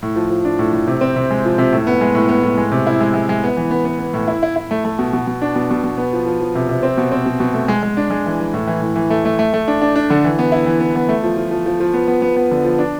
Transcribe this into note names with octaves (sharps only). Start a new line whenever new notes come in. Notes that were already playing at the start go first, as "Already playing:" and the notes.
A2
F3
F3
D4
A2
A2
C3
C4
C3
G#3
F3
C3
A2
B3
G#3
A2
B3
A2
G#3
C3
E4
G#3
G#3
G#3
B3
E3
B3
B3
B3
A2
E4
E4
E4
A3
A3
B2
B2
B2
D4
B2
B2
B2
B3
F3
F3
F3
C3
C3
C4
B2
C4
B2
B2
A3
G#3
G#3
D4
G#3
E3
E3
A2
E3
A2
E3
A3
A3
A3
A3
D4
D4
D4
D3
E3
B3
E4
E3
B3
B3
A3
F3
F3
F3
F3
F3
B3
B3
B3
B3
D3
F3
D4